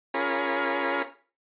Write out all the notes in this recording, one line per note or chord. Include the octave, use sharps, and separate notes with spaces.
C#4 F4 G#4 A#4 B5